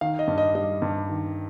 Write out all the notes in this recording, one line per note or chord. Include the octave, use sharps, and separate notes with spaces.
D#3 F5
D#5
G2
D#5
G3 D#5
G2
D#3